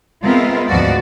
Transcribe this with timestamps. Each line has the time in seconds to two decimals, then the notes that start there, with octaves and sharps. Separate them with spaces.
0.24 G#3 B3 C4 F4 A#4 E5
0.68 D2 G#2 F3 B3 F#4 D5